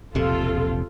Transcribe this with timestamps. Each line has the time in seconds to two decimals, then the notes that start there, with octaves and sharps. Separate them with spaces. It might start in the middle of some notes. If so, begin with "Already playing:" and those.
0.15 E1 A#1 C3 F4 A4